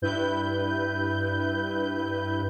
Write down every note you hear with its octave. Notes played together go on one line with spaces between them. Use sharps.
G2 E4 B4 G6